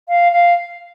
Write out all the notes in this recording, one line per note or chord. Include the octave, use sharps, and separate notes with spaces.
F5
F5